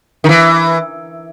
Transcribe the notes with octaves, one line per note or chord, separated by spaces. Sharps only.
D#3
E3